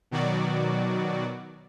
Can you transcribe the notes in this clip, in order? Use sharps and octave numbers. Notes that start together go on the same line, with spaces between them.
B2 D#3 F#3 F#4 D5